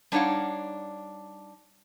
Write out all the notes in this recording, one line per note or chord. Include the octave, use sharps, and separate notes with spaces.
G3 D4 D#4 C#5 F5 F#5